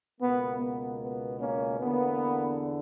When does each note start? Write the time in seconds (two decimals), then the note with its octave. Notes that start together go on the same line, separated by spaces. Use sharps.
0.20 C#2 B2 A#3 B3
0.59 B3
1.00 B3
1.40 A#3 C#4
1.80 E2 D3 A#3 B3